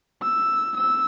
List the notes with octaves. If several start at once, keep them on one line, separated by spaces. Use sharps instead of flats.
E6
E6